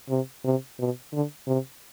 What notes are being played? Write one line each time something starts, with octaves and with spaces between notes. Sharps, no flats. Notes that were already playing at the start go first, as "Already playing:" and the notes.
C3
C3
B2
D3
C3